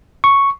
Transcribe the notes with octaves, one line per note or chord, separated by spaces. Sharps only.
C#6